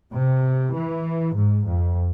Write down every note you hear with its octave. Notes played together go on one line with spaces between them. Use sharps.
C3
E3
G#2
F2